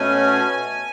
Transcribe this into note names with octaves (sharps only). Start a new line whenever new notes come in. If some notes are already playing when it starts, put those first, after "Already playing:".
Already playing: B2 A3 C#4 G#5